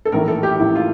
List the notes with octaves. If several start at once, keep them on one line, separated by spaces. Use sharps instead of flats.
A4
A#1 A2 E3 A#4
A4
G4
A#1 A2 E3 E4
F4